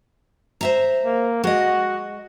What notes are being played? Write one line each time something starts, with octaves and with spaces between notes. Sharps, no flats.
C5 E5 A#5
A#3
G#3 F#4 D#5